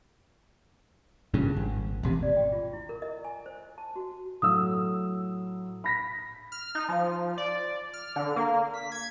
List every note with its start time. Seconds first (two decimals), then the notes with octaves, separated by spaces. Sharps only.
1.34 G#1 G2 A#2 C#3
1.56 G#1
2.03 E1 A1 C3
2.23 D5
2.37 G5
2.52 F4
2.73 E4
2.89 A#4
3.02 D#5
3.24 G#5
3.46 C5
3.78 A5
3.96 F#4
4.42 A2 F#3 D#6 E6
5.84 B5 A#6 B6
6.52 F6
6.75 D#4
6.89 F3
7.38 D5
7.93 F6
8.16 D3
8.36 A#3
8.74 B6
8.92 G#6